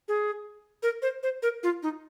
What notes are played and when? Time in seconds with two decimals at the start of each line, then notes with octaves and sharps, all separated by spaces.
0.08 G#4
0.83 A#4
1.02 C5
1.23 C5
1.43 A#4
1.63 F4
1.83 D#4